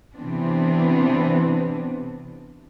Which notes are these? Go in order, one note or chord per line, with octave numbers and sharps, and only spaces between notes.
C3 E3 B3 C4 D4